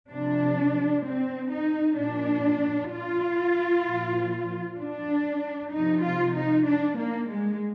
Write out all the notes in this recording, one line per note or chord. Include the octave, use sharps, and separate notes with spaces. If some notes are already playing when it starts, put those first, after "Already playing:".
C3 F3 D4
C4
D#4
A#2 F3 D4
F4
A#2 F3
D4
C3 F3 D#4
F4
D#4
D4
A#3
G#3